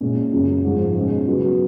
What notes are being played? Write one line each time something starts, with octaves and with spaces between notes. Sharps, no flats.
A#2 G#3 C#4
F#2 C#3 F#3
G#2 F3 G#3
B2 G#3 C#4 G#4
C#3 F#3 B3 F#4